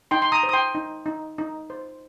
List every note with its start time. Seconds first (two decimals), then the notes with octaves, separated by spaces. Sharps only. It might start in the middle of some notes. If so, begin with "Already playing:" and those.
0.11 D#4 G5 C6
0.22 C6
0.32 A#5 D#6
0.43 C5
0.49 D#6
0.53 G5 C6
0.75 D#4
1.06 D#4
1.38 D#4
1.70 C5